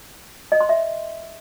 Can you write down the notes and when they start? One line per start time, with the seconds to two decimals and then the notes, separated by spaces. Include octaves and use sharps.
0.52 D#5
0.61 C6
0.69 E5